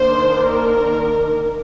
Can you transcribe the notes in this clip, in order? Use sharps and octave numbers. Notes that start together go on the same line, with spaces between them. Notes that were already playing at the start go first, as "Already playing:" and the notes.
Already playing: D#3 A#3 D4 C5
A#4